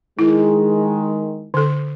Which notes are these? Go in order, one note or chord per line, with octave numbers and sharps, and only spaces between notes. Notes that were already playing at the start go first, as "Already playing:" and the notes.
D#3 G#3 E4
D3 A4